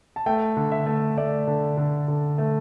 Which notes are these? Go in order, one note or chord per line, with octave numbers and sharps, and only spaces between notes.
A5
A3 G5
D3
E5
A3
A3 D5
D3
D3
D3
A3